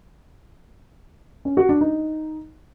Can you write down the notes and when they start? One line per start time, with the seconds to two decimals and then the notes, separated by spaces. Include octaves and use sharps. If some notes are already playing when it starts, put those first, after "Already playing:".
1.45 C#4
1.57 F#4
1.69 D4
1.81 D#4